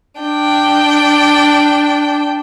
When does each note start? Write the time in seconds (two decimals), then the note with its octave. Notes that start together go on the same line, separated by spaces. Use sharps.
0.21 D4 G5